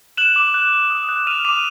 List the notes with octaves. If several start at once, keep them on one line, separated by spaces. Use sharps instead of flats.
F#6 E7 F#7
D6
F#6
F#6
D#6
F#6
F6 D#7 F7
D6 D#7 F7